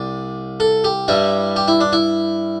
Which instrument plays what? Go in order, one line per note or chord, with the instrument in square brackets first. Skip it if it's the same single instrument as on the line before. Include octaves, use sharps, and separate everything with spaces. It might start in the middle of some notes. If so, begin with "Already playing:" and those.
Already playing: [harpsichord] C2 C3 D5
A4
G4
G2 G3 E4
G4
E4
D4
E4